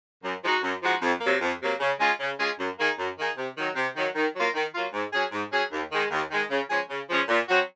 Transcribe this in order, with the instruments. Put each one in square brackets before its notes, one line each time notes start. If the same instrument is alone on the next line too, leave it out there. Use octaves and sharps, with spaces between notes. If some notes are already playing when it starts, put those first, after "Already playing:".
[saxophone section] F#2
F3 G#3 D#4 F#4
F#2
F3 G#3 D#4 F#4
F2
C3 F#3 A#3
F2
C3 F#3 A#3
C#3
G#3 C#4 F4 G#4
C#3
G#3 C#4 F4 G#4
F#2
D#3 A#3 D#4 G#4
F#2
D#3 A#3 D#4 G#4
C3
D#3 F#3
C3
D#3 F#3
D#3
F#3 A#3 F4
D#3
F#3 A#3 F4
G#2
F#3 C#4 G#4
G#2
F#3 C#4 G#4
D#2
D#3 G#3
D#2
D#3 G#3
C#3
F3 G#3 C#4 G#4
C#3
F3 G#3 C#4 G#4
A#2
F#3 C4 F#4